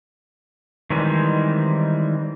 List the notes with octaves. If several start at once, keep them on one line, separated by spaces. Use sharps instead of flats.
D#3 E3 G3 G#3 C4